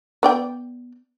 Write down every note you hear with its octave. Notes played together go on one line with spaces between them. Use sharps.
B3 D5 G5